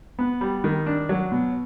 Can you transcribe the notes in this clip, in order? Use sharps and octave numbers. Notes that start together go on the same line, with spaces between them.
B3
G3
D#3
D4
F#3
B2